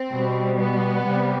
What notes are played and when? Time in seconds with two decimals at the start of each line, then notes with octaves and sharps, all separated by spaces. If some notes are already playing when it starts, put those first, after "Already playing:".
Already playing: C4
0.12 B2 G3
0.59 B3
1.06 C3 G3